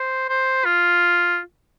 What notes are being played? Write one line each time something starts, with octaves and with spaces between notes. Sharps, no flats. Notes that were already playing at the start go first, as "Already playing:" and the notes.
Already playing: C5
C5
F4